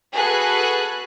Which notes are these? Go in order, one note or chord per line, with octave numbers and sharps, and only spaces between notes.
F#4 G#4 A4 B4 F#6